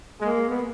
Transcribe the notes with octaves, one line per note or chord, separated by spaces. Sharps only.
G#3 A#3
B3